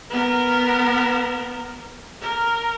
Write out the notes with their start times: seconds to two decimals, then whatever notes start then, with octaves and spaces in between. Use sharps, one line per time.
0.10 B3 A#4
2.21 A#4